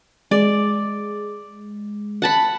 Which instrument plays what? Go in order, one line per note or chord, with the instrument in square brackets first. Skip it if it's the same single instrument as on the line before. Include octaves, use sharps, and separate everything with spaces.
[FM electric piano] G#3 [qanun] D5
[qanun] F#5 A5 B5